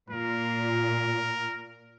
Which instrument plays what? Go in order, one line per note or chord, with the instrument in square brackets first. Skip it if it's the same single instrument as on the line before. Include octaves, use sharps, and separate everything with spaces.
[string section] A#2 [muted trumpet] A#4